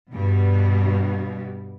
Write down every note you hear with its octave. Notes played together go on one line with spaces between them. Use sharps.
G2 B2 G3